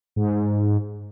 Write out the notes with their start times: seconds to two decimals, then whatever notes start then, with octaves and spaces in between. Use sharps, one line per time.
0.16 G#2